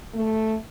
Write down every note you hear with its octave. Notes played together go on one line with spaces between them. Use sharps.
A3